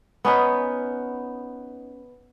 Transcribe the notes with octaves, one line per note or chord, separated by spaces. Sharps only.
B3 C#4 D#4 B4